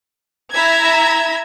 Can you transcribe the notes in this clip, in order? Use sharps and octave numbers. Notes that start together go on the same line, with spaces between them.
E4 E5 A#5 G#6